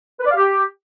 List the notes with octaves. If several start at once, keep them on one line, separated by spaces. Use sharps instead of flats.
B4
D5
F5
G4